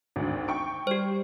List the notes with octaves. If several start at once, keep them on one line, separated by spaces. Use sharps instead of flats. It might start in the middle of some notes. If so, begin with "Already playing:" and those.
G#1 D2
G5 C#6 D7
G3 G4 C5